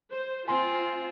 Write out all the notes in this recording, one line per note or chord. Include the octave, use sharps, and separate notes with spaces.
C5
C4 F4 G#5 C6